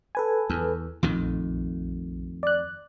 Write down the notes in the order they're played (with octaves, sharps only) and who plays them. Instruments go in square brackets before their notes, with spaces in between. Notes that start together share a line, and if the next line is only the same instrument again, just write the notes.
[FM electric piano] A4 B4 G#5
[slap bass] E2
[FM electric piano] A#1 [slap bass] F2 A2 D#3
[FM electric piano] D5 F#6